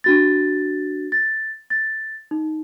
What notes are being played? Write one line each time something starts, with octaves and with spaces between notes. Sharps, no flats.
D4 F#4 A6
A6
A6
D#4